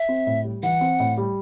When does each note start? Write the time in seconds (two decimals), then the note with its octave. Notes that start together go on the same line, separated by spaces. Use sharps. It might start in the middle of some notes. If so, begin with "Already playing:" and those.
Already playing: E5
0.09 C4
0.27 A2
0.44 G3
0.63 E3 F#5
0.81 C4
1.00 A2
1.17 G3